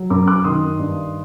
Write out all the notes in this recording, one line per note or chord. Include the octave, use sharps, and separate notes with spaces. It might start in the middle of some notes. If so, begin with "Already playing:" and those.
Already playing: F#3
F#2 A#5 D6
D6 F#6
D#3 C6 D#6
G2